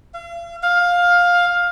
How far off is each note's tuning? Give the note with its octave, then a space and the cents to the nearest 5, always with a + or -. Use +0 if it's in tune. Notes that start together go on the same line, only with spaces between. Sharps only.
F5 -40
F5 +15